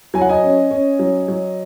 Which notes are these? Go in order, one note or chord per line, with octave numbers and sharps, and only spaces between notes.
F#3 G#5
F#5
D#5 G#5
C#4
C#4
F#3
F#3